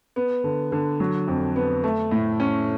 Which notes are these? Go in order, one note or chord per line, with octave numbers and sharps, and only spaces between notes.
B3
D3
D3
F#3
F2
B3
A3
A2
C#4